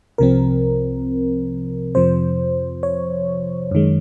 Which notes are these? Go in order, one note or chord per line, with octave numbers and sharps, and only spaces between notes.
C2 C3 F3 C4 A#4
F2 C3 F3 C5
C#5
F#2 D#3 G#3